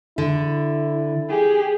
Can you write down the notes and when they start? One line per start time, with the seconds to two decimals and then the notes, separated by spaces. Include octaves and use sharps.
0.18 D3 E4
1.29 G4 G#4